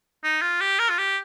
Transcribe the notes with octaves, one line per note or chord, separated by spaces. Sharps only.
D#4
F4
G4
A#4
F4
G4